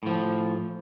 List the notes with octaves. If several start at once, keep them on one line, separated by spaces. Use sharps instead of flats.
A2 F3